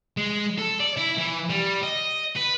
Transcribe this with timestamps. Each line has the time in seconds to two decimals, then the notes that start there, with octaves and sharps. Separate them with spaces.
0.17 G#3
0.58 A4
0.80 D5
0.97 E4
1.18 E3
1.50 G3
1.83 D#5
2.36 B4